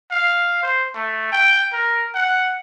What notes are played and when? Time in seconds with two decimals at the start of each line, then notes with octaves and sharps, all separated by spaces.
0.11 F5
0.62 C5
0.94 A3
1.32 G5
1.73 A#4
2.14 F#5